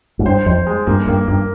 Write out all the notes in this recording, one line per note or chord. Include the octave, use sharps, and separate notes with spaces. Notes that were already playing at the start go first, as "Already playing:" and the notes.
G#2
G2 C5
F2 C5
G#3
G2 A#3
G2 A#3
G2 A#3